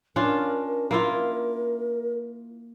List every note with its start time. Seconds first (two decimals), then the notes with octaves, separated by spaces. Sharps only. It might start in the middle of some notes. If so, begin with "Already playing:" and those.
0.16 C#4 D4 F4 A#4
0.91 A#3 E4 F4